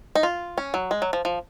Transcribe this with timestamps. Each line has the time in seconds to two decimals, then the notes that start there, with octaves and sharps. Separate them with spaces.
0.15 D#4
0.23 F4
0.58 C#4
0.74 F#3
0.91 G#3
1.02 F#3
1.13 F3
1.25 F3